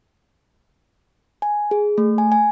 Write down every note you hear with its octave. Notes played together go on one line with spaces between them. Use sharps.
G#5
G#4
A3
G#5
G#5